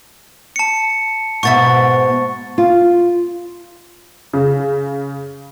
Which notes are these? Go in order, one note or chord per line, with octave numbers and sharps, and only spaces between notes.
A5 C#7
G#2 B2 E5 C#6 A6
F4
C#3